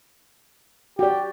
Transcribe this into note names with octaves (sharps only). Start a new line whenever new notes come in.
F#4 G4 D5